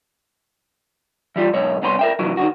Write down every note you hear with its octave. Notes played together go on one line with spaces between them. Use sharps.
E3 G3 F4
B1 G#2 C#5
C2 B3 C#4 A#5 C6
A#4 E5 G5
C3 E3 F#3
D#3 E3 F#4